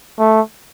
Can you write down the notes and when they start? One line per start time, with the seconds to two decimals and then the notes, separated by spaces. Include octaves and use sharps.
0.19 A3